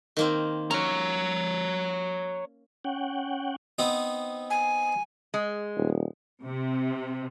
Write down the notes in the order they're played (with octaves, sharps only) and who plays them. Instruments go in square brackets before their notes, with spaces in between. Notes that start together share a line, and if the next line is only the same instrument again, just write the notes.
[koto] D#3 A#3 C4
[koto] C#4 [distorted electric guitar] C#5 A#5
[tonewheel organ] C#4 F#5 G5
[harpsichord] B3 C4 D#4
[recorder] G#5
[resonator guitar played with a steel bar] G#3
[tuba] D#1
[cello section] C3